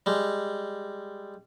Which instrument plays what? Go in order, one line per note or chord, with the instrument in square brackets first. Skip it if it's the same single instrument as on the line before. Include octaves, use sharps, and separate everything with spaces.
[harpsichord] G3 G#3